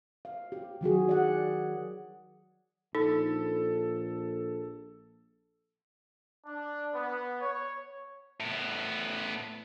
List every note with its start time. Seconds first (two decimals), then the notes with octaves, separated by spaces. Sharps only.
0.25 F5
0.52 G4
0.81 D#3 F#3 F#4 G#4
1.09 D5 F#5
2.95 A#1 D#4 A4
6.46 D4
6.94 B3
7.41 C#5
8.40 A2 B3